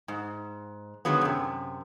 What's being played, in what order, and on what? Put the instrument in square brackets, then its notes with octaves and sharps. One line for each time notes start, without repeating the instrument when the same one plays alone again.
[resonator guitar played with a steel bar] G#2
D3 D#3 F#3 G#3 B3
F#2 C3